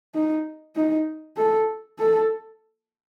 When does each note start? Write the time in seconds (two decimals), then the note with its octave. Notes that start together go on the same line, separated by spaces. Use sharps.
0.15 D#4
0.76 D#4
1.37 A4
1.99 A4